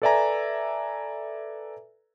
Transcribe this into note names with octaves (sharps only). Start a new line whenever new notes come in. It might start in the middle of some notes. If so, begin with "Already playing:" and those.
A4 B4 D5 E5 G#5 A#5